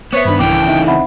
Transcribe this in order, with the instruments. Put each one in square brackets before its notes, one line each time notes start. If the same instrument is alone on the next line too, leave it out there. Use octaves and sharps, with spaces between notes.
[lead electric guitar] B3 [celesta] C5 E5 [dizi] C#5 [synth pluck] C#6 G#6
[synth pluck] G2 D#3 D4 [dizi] B5
[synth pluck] B1 [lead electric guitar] C#3 E3 [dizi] G5 [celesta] D6
[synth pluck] C3 D#4 [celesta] E5
[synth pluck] C4 [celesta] E5 F#5 B5